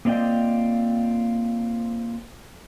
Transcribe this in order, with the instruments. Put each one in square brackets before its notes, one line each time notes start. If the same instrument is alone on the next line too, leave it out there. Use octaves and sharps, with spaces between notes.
[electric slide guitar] A#3 C4 F4 D5 D#5 G5